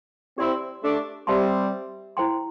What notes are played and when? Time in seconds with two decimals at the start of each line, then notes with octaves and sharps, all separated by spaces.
0.38 C4 E4 G4 D5 C6
0.83 A3 D4
1.27 G3 C4 G4 E5 A5 C6
2.17 E4 C5 G5 C6